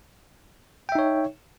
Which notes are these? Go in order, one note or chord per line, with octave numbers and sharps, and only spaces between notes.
D#4 C#5 E5 G5